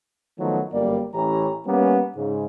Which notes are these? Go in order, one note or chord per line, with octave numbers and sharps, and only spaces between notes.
D#3 F3 F#3 A3 B3 D#4
G1 F#2 G3 A#3 D5
A1 E3 C#4 G4 A#5
G3 A#3 B3 C#4
G#2 C#3